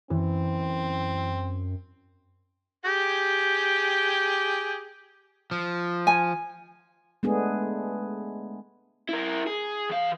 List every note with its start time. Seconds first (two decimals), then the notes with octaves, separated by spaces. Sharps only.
0.10 F#2 E3 C4
2.85 G4 G#4 G5
5.51 F3
6.07 G#5
7.23 G#3 A3 B3 D4 G#4
9.09 E4 A#4
9.47 G#4
9.90 E3 F5